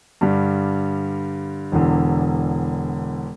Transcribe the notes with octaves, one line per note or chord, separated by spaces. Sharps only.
G2 D3 G3
E1 E2 D3